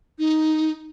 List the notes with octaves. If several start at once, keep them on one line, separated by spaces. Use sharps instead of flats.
D#4